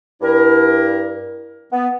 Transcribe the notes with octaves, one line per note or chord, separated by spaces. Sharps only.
G2 E4 A#4
B3